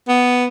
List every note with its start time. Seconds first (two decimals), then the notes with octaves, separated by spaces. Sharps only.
0.08 B3